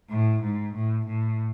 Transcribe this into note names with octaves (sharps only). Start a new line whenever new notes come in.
A2
G#2
A2
A2